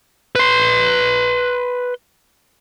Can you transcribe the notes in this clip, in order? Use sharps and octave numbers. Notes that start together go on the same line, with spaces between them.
B4 C6